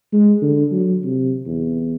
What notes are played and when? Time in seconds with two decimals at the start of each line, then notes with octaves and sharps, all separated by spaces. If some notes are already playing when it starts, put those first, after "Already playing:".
0.13 G#3
0.42 D3
0.72 F#3
1.04 C3
1.46 E2